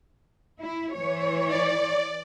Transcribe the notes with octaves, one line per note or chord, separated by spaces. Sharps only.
E4
E3 C#5
D5